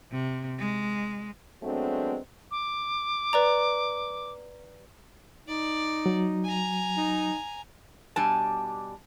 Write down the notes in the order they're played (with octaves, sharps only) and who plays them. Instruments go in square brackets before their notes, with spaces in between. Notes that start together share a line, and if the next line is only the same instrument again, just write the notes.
[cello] C3
G#3
[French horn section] F#3 G#3 A3 B3 C4 D4
[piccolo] D6
[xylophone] B4 D5 A#5
[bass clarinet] D#4 [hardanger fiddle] D5
[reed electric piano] F#3
[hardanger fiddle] G#5 A#5
[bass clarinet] D#4
[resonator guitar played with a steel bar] B2 G3 D4 G#5 A5